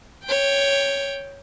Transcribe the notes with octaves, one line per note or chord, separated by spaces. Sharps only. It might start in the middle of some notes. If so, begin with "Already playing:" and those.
C#5 G5